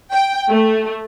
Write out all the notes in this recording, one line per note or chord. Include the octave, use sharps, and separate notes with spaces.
G5
A3